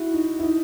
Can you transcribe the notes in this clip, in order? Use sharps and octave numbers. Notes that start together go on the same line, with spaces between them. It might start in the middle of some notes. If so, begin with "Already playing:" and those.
Already playing: E4 F#4
D#4
E4
D#4